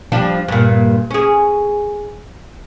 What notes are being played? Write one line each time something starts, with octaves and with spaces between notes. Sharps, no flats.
F3 G3 D4
G2 A#2
C#4 G#4